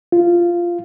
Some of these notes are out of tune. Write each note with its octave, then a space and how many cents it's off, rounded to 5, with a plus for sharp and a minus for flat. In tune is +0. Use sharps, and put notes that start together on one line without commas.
F4 -10